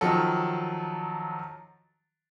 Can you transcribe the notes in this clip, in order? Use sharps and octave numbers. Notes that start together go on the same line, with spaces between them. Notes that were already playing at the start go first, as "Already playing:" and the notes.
D#3 F3 F#3 A4